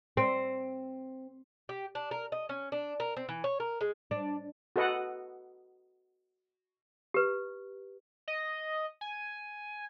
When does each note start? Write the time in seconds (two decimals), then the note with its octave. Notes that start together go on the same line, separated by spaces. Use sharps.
0.17 C4
1.69 G4
1.95 D4
2.11 A#4
2.32 D#5
2.49 C#4
2.72 D4
3.00 A#4
3.16 C4
3.29 E3
3.44 C#5
3.60 A#4
3.81 G#3
4.11 D4
4.76 F#4 A4 B4 D#5 F#5
7.14 G4 B4
8.28 D#5
9.01 G#5